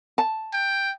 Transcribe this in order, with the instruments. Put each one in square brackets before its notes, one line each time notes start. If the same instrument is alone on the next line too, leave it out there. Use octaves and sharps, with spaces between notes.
[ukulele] A5
[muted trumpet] G5